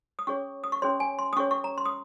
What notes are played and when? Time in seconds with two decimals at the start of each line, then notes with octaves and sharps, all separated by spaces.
0.19 D#6
0.27 C#4 G#4 C#5 C#6
0.64 D#6
0.72 C#6
0.82 C#4 G#4 C#5 C6
1.00 G#5
1.19 C6
1.33 D#6
1.37 C#4 G#4 C#5 C#6
1.51 C#6
1.64 A#5
1.78 C6
1.86 D#6